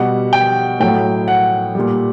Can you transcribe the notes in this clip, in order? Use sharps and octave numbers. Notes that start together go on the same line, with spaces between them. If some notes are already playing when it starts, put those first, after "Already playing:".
Already playing: B2 G3 F#5
G5
A2 F#3 G5
F#5
A#2 G3